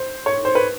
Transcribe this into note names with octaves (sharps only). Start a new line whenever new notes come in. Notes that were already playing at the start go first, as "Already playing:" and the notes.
Already playing: C5
C#5
C5
B4